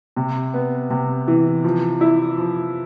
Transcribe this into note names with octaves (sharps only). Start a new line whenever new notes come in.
C3
B3
C3
E3
F3
E4
F3